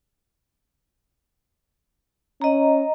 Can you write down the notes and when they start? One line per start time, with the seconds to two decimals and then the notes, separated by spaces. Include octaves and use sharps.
2.42 C#4 D#5 A#5